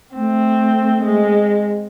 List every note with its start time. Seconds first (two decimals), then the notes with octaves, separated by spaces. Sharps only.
0.15 A3 C4
1.03 G#3